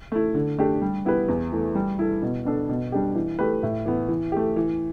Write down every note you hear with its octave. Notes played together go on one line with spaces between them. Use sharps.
A3 E4
D3
A3 D4 G4
G3
B3 E4 G4 B4
E2
E3 A3
G3
E4 A4
B2
B3 D4 A4
B2
G3 D4 G4
E3
A3 G4 B4
A2
E3 B3
E3
A3 G4
E3